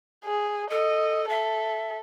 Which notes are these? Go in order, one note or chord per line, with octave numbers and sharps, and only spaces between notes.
G#4
A4 D#5
A4 E5